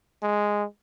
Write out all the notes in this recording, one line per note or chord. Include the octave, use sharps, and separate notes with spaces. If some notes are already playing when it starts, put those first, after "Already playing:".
G#3